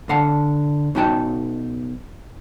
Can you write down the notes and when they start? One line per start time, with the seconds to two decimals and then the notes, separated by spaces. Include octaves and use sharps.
0.09 D3 F5 F#5 A5
0.95 B1 C#4 D#4 F#4 G5 A5